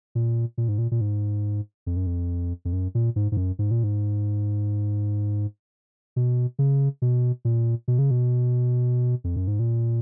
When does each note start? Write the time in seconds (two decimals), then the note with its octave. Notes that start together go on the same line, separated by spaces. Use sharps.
0.15 A#2
0.58 A#2
0.68 G#2
0.78 A#2
0.91 A#2
1.01 G#2
1.87 F2
1.96 F#2
2.07 F2
2.65 F2
2.73 F#2
2.95 A#2
3.16 G#2
3.32 G#2
3.37 F#2
3.59 G#2
3.71 A#2
3.84 G#2
6.16 B2
6.59 C#3
7.02 B2
7.45 A#2
7.88 B2
7.99 C#3
8.11 B2
9.24 F2
9.36 F#2
9.47 G#2
9.59 A#2